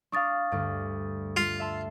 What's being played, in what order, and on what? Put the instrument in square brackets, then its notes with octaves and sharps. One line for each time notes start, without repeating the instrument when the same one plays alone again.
[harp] D4 F5 [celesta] C#6 D#6 A6
[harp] D2 G2
[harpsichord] F4
[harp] E5 A5 C6